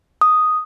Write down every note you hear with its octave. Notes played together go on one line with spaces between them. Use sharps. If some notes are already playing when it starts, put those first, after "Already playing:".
D#6